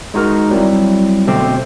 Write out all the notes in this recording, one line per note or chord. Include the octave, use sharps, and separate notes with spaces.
G#3 D#4 F#4 A#4
F#3 G3 C4 E4
B2 D3 A3 C4 G4